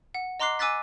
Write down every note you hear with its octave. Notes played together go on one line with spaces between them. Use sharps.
F#5
D#5 A#5 C6 D6 F#6 C7
G#5 D6 E6 F#6 A6 B6